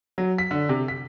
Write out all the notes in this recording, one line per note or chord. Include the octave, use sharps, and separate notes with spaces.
F#3
B6
D3
C3
B6